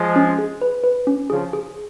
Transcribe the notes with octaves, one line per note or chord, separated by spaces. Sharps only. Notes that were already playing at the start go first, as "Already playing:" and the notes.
Already playing: F3 G#3
C#4
G#4
B4
B4
C#4
C#3 F3 G#4
G#4